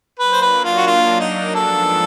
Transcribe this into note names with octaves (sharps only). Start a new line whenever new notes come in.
F#3 A#3 D4 B4
C5
B4
F4
F#4
F4
D#4
G#2 F3 G#3 B3 D4 A4